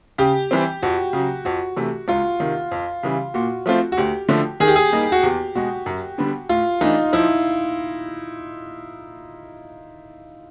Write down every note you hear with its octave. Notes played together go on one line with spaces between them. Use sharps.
C#3 G4
E3 G3 C4
F2 F#4
C#3 F#3
F2 F#4
C3 E3 A3
C#2 F4
C3 D#3
F2
C#3 E3 G3
A#2 F#4
F3 A3 C4 F4
F#4
D2 G4
D3 F3 A3
D#3 G#4
G4
G#4
G3 A#3 D#4
F#4
E2 G4
B2 G#3 F#4
F#2
D3 G3 B3 D4
A2 F4
E3 A3 D4 D#4
F3 E4